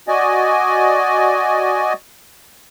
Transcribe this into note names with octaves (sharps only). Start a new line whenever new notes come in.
F#4 D5 D#5 G#5